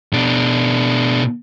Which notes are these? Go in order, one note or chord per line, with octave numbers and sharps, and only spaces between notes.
B2 D4